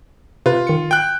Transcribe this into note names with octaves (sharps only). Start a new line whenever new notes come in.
C3 F4 B4
D#3 C#7
G5 F#6